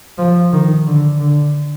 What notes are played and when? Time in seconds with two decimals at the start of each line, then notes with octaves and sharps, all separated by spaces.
0.18 F3
0.52 D#3
0.86 D3
1.20 D3